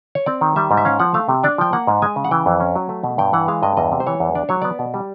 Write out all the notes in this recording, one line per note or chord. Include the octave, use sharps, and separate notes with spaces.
C#5
C4 D5
D#3
G3 E5
G#2
E5
C#4 F5
F3 F#5
A3 F5
C3
D4 D5
F3 G5
A#3 F#5
G#2
G#3 G#5
C#3
F#5
E3 G5
F2
C#4
F#3
A3
B2
G2 G5
E3 F#5
G#3 F5
G2 D#5
E2 D#5
C3
C5
E3 C#5
E2
D4 D5
F#3 C#5
B3 D5
B2
G3